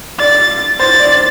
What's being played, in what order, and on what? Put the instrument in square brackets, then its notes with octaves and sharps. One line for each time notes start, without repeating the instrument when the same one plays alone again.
[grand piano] D5 [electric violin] A6
[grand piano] C5 [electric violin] A6
[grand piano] D5